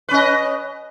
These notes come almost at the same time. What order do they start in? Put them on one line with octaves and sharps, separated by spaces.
B4 C#4 D#5